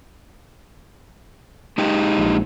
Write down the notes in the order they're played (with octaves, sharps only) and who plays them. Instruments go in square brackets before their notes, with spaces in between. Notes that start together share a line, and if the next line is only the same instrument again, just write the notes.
[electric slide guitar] G#3 D#4 G4
[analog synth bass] A#1